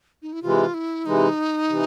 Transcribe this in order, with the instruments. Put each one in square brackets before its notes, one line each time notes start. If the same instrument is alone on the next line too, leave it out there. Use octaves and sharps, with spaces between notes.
[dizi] D#4
E4
[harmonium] C3 E3 G#3 [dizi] F4
[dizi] E4
[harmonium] C3 E3 G#3 [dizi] D#4
[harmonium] C3 E3